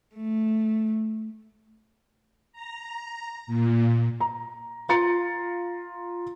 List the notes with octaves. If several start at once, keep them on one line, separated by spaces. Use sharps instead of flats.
A3
A#5
A#2
A#5
F4 A#5 C6 A6 C#7